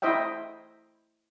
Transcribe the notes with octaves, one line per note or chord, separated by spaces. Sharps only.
E4 C5 D#5 E5 G5